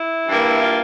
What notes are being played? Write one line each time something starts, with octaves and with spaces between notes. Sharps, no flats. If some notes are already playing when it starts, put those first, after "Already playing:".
Already playing: E4
G2 E3 A#3
F4